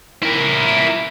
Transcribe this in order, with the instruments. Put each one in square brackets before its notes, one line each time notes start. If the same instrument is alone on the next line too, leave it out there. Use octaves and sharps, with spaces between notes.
[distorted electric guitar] E4 A#4